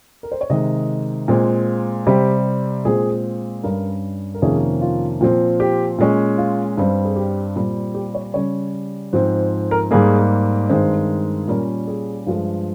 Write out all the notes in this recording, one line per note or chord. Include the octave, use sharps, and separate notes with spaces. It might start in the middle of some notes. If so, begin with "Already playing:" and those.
A#4
C5
C#5
C3 D#3 G#3 D#5
A#2 G#3 C4
C3 G3 C4 G4
A#2 G#3 C4 G#4
G2 G3 C#4 A#4
A#4
F2 C3 D#3 A#3 C#4 G#4
F4
A#2 F3 C4
G4
A#2 G#3 C#4
F4
G2 G3 C4
G#4
G4
A#2 G3 C4
G4
C#5
C#3 G3 C#4 C#5
G#2 F3 C4
A#4
G#2 G3 A#3 G#4
G2 D#3 G#3 C4 C5
A#2 G3 C#4 A#4
G#4
G2 F3 G#3